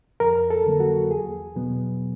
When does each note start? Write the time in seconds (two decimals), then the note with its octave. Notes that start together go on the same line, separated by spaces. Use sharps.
0.20 F2 A#4
0.50 A4
0.66 D3 F#3 A#3
0.80 F#4
1.11 E2 G#4
1.56 B2 F#3 B3